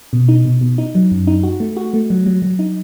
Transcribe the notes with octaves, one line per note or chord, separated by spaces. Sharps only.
B2
D#4
B2
B2
D#4
F#3
F#2
D#4
F#4
A3
F#4
A3
F#3
F#3
F#3
D#4